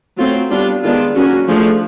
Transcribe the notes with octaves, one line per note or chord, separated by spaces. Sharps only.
F#3 A3 C4 F4
G3 B3 D4 F4
D#3 G#3 B3 D4 F4
F#3 A#3 C#4 F#4
F3 A3 D4 G#4